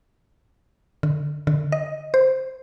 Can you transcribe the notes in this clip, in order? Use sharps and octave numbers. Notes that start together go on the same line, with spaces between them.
D3
D3
D#5
C5